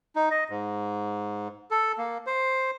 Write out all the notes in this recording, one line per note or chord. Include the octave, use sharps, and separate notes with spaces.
D#4
D#5
G#2
A4
A#3
C5